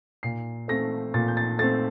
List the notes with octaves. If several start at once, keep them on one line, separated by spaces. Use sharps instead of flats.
A#2 C7
A3 C4 A#6
A#2 A6
G6
A6
A3 C4 A6